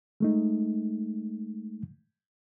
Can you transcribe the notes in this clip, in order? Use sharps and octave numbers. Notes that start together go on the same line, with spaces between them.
G#3 A3 D#4